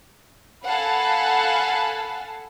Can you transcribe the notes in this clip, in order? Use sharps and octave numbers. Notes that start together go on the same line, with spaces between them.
A4 F5 F#5 G#5 A5 B5